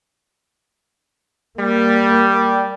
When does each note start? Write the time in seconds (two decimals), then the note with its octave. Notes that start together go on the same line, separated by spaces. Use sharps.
1.59 G3 A#3